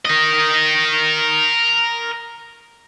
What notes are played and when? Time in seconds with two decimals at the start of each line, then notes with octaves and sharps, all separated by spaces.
0.05 A#4 D#5